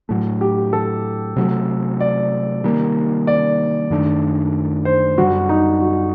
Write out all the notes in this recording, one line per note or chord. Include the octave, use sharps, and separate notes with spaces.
A2 F#3 A3
G4
A4
C3 F#3 A3
D5
C3 D#3 G3 A#3
D5
F#2 D#3 A3 D4
C5
F#2 D3 G3 F#4
D#4
F#4